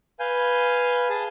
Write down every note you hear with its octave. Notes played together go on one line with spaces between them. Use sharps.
B4 F5 G#5 G6
G#4 A5